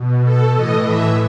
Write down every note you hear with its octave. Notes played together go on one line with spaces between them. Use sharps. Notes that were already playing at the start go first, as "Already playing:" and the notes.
Already playing: B2
A4
A2 E3 D#5
E5